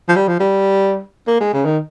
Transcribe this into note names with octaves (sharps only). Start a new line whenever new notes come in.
F3
G3
F3
G3
A#3
G#3
C#3
D#3